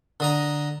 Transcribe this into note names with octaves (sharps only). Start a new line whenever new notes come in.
D3 D#5 A#5